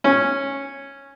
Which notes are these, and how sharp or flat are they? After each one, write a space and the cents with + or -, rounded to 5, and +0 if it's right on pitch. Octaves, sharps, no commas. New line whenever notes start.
C#4 -5